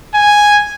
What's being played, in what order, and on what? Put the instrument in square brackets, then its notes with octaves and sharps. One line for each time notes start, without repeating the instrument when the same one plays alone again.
[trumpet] G#5